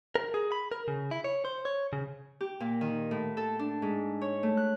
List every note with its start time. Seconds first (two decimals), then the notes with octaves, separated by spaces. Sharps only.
0.15 A#4
0.34 G#4
0.52 B5
0.72 A#4
0.88 C#3
1.11 E4
1.24 C#5
1.45 C5
1.65 C#5
1.93 C#3
2.41 G4
2.60 A#2
2.81 D#3
3.11 A2
3.37 A4
3.59 D4
3.82 G#2
4.21 C#5
4.43 A3
4.57 F#6